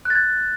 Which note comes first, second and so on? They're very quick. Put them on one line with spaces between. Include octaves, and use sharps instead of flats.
F#6 A6 G#6